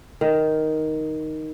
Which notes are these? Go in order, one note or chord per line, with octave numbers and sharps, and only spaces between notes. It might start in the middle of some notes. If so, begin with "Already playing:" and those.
D#3